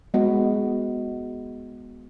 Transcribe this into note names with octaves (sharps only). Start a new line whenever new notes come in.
G#3 B3 F#4